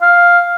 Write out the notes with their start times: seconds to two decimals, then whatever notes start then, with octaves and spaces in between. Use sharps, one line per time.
0.02 F5